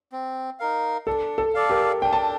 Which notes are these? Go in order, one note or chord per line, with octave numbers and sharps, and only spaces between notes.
C4
D#4 A#4 F5
D4 A4
A4
A4 D5 F5
G4 A#4
D4 G5
A5